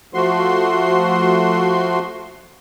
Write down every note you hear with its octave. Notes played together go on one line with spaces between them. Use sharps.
F3 A3 F#4 C6